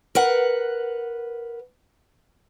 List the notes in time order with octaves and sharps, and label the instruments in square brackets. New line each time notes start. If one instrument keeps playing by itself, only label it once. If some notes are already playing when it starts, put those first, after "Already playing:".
[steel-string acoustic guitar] A#4 B4 F#5